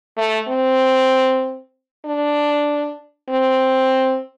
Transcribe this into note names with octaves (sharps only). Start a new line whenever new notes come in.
A3
C4
D4
C4